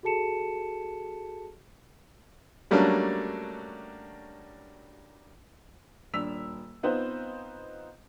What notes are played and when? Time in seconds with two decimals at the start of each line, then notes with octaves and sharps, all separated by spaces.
0.03 F#4 G#4 A4 A5 C#7 E7
2.71 F#3 G3 A3 A#3 C#4 D4
6.14 D#1 D4 E6 B6 F7
6.83 B3 C4 D#4 F4 B4 C5